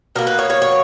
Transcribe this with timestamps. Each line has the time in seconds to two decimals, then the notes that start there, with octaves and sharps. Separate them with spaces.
0.16 B2 A#3 A#4
0.27 B4
0.39 C#5
0.50 C#5
0.62 C#5